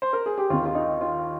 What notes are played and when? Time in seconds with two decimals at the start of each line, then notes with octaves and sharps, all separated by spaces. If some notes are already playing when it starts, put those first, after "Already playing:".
0.02 C5
0.13 A#4
0.26 G#4
0.38 G4
0.50 D#2 F4
0.53 D#3
0.66 F4
0.75 D#4
1.01 F4